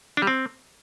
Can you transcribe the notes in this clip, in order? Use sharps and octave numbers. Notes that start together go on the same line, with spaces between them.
D4
G3
C4